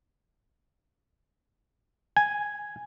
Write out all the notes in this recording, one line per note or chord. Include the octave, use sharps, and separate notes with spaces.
G#5